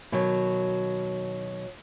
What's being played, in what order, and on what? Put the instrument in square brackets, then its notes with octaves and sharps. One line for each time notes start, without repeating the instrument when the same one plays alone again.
[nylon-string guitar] B2 D#3 F#3